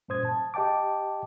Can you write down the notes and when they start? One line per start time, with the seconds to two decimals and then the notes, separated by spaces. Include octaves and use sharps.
0.08 G2 A#2 C#4 C5 D#6 G#6
0.25 A5
0.54 G4 D#5 G5 A5 D6